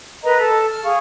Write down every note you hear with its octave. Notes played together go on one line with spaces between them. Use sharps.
A#4 B4 D#5 A#5
A4
A5 F6
G#4 F5 C#6